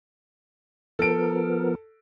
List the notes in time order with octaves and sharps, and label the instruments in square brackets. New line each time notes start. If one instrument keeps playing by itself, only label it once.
[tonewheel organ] F3 B3 A#4 [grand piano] A4 D7